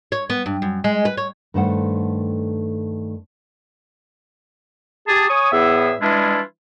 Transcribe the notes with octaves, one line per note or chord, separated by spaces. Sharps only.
C#5
B3
G2
F#2
G#3
B4
C#5
G2 D#3 A3 A4 C5 F#5
G4 G#4 A5
C#5 G#5 C#6 D#6
E2 A2 B3 G#4 E5
E3 G3 G#3 D4 E4 F4